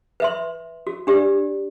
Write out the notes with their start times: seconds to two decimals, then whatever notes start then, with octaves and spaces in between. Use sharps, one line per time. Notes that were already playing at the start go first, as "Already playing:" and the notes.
0.20 B4 E5 C6
0.87 F#4
1.07 D4 G4 D5